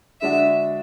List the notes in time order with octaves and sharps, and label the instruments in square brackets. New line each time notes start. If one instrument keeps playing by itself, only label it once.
[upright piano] D3 G#3 D4 F#4 [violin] E5